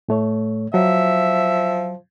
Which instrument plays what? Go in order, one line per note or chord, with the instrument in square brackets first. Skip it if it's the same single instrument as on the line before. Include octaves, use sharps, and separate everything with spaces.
[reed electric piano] A2 A3 C#5
[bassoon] F3 [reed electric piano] F#3 [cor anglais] E5